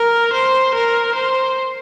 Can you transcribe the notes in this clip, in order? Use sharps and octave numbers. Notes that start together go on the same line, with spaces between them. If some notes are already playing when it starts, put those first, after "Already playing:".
Already playing: A#4
C5
A#4
C5